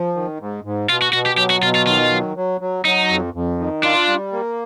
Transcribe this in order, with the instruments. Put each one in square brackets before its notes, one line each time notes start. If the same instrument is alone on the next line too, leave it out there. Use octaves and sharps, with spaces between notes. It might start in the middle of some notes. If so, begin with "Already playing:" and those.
Already playing: [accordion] F3
D#3
G#2
G#2
[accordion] B2 [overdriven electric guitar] F4
[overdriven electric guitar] F#4
[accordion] B2 [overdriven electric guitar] F#4
[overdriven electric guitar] G4
[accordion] F#3 [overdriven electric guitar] G4
[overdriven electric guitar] F#4
[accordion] B2 [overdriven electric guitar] F4
[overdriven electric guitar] F4
[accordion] D#3 [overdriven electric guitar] F4
[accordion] F#3
F#3
F#3
[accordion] F#3 [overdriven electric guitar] D#4
[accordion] F2
F2
D#3
[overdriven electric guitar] D4 [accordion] F4
[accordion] G3
A#3